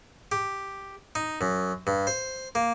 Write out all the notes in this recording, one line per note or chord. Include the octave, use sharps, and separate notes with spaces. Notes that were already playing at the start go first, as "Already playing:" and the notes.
G4
D#4
F#2
G2
C5
A#3